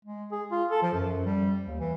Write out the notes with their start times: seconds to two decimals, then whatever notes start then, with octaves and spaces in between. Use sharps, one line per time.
0.05 G#3
0.32 G#4
0.52 F4
0.71 A4
0.83 F3
0.94 F#2
1.25 G3
1.68 D#2
1.80 E3